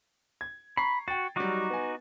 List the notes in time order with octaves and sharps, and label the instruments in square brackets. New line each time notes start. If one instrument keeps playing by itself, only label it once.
[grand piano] G#6
[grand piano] A#5 C#6 C7 [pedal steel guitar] B5
[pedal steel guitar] F#4 [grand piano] G5 A6
[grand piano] F#3 G3 [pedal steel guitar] D#4 F#4 D6
[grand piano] B3 G#5